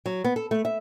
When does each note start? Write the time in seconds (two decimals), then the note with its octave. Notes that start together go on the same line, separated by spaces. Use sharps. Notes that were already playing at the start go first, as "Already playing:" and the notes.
0.06 F#3
0.24 B3
0.36 A4
0.51 A3
0.65 E5